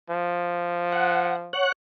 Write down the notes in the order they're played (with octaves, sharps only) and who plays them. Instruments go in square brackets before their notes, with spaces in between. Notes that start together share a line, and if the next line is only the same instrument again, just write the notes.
[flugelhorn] F3
[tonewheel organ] F#5
C#5 F#5 F#6